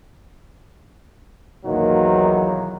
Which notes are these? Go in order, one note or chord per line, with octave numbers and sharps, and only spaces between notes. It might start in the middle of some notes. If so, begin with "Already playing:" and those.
B1 E2 A#2 D#3 F#3 A#3